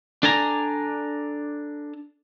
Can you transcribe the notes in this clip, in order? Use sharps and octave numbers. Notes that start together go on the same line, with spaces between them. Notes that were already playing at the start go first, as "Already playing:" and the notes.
D4 A4 D5 G#5 A#5